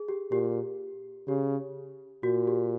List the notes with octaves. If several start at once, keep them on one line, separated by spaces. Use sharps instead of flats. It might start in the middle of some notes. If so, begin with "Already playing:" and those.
Already playing: G#4
G4
A#2 G4
C#3 G4
A#2 F#4
G4